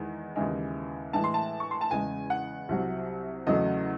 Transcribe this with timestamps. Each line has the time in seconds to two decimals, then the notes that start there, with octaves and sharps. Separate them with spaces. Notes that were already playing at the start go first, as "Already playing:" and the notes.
Already playing: E2 D#3 G#3
0.36 D#2 C#3 E3 G#3
1.13 A2 E3 G#3 A5
1.24 C6
1.34 A5
1.60 C#6
1.71 C6
1.81 A5
1.91 E2 C#3 G#3 G#5
2.30 F#5
2.69 C2 C3 F#3
3.47 E2 C#3 F#3 A3 D#5